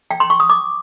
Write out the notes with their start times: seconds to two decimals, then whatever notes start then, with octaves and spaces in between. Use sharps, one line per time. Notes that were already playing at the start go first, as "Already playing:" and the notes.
0.11 G5
0.20 C6
0.30 C#6
0.40 D#6
0.50 D6